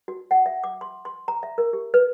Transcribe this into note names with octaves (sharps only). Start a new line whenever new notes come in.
F#4
F#5
E5
D6
C6
C6
A#5
E5
A#4
G4
B4